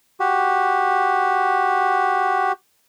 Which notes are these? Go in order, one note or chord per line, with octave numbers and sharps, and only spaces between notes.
F#4 G4